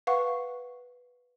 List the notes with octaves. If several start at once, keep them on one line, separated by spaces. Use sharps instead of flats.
B4 F5 F#5 C#6